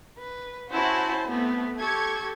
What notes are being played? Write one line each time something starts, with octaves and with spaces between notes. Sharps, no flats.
B4
C#4 E4 F#4 C5 A5
A3 B3 C4
G4 A4 C#6 G#6